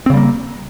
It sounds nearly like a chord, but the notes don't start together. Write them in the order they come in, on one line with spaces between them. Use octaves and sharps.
C4 C#3 G3 A#3